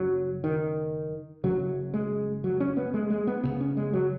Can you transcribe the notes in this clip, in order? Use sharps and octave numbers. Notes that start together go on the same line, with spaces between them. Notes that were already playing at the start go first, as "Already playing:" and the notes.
Already playing: F#1 F#2 C#3 F#3
D#3
F#1 F#2 C#3 F#3
G#3
F#3
C#4
B3
G#3
G#3
B3
F#1 F#2 C#3 B3
C#4
G#3
F#3